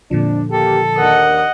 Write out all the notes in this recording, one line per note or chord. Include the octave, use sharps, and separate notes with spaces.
F2 A#2 D3 F3 D4
D#2 A#3 G4 A4
D#2 D4 A#4 D#5 F#5